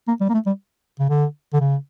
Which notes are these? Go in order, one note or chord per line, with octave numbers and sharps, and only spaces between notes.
A#3
G3
A#3
A3
G3
C#3
D3
D3
C#3